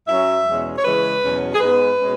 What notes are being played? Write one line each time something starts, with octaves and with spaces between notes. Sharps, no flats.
F#2 F#3 C#4 E5
E2 B2 G#3 C#4
C#5
C#3 E3 G#3 C#4 B4
E2 B2 F#3 C#4
G#4
G#2 G#3 B3 B4
B2 G#3 C#4